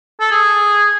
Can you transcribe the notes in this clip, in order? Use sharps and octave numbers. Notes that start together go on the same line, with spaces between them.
A4
G#4